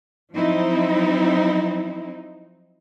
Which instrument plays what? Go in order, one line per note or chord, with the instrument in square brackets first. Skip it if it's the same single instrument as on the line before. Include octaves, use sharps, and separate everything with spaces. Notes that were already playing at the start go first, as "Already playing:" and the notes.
[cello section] F3 F#3 C4 D#4 E4